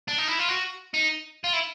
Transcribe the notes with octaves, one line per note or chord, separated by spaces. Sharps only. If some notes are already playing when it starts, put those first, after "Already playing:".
D4
D#4
E4
F4
F#4
D#4
F4
E4